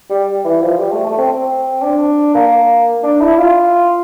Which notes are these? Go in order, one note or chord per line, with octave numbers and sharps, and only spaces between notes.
G3
E3
F3
G3
A3
A3
C4
C4
D4
A#3
D4
E4
F4